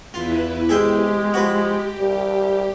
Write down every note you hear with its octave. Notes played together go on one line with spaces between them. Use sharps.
E2 E4 F4 B4
C3 G#3 G4 G#4 E5 G5
F3 F#4 B4
G3